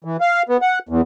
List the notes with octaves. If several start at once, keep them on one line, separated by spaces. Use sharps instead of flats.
E3
F5
B3
F#5
E2